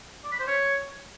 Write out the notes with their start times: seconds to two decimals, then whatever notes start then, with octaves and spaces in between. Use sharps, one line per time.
0.24 D5
0.32 B5
0.40 C5
0.47 C#5